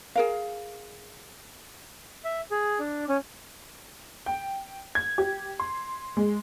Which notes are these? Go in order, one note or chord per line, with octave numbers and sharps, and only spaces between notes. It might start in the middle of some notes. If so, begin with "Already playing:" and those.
G#4 A#4 F5
E5
G#4
D4
C#4
G5
G#6
G4
C6
G#3